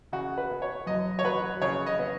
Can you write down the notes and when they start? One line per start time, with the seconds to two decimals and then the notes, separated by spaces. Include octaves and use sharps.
0.13 C#3 F#4
0.38 B4
0.51 B3
0.62 C#5
0.87 F#2 D#5
1.19 C#5
1.24 F#3 B4
1.62 C#3 C#5
1.86 D#5
1.99 B3